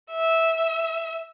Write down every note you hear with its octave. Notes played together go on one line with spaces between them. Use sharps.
E5